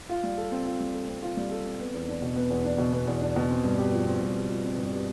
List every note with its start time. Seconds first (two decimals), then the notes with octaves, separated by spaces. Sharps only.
0.09 F4
0.24 G3
0.38 A4
0.52 C4
0.65 F4
0.80 G3
0.94 A4
1.09 C4
1.22 F4
1.37 G3
1.51 A4
1.65 C4
1.79 B3
1.94 E2
2.08 D4
2.22 B2
2.36 B3
2.50 E2
2.64 D4
2.78 B2
2.93 B3
3.07 E2
3.21 D4
3.36 B2
3.50 C4
3.64 G2
3.78 G4
3.92 F3
4.07 C4
4.21 G2
4.35 G4
4.49 F3
4.64 C4
4.78 G2
4.92 G4